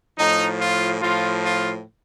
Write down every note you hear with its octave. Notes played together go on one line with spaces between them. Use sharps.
A2 F3 D#4
F4
A2 F3 F4
F4